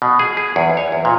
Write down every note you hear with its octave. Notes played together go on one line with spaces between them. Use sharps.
B2
G#4
G#4
E2
C#5
E2
A#2